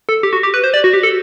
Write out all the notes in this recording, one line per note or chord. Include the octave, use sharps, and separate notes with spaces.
A4
G4
F#4
G4
B4
C5
D5
F#4
G4
A4